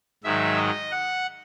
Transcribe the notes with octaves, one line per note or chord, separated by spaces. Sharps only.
G#2 D#3 F#3 E5
D#5
F#5